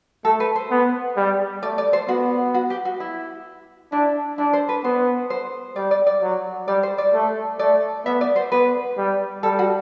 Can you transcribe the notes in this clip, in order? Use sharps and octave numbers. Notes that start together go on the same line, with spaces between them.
A3 A4
B4
C5
B3
G3
A3 D5
D5
C5
B3 F#4
F#4
G4
F#4
E4
D4 E4
D4 E4
C5
B4
B3 C5
C5
G3 D5
D5
D5
F#3
G3 D5
C5
D5
A3
A3 D5
B3 E5
D5
C5
B3 B4
G3
G3 A4
F#4